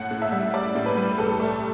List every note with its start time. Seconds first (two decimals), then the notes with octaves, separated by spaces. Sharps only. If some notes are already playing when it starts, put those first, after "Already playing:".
Already playing: A2 F#5
0.11 A2
0.22 E5
0.32 G3
0.54 G3 D5
0.75 A2
0.86 B4
0.97 G3
1.18 C2 A4
1.40 A3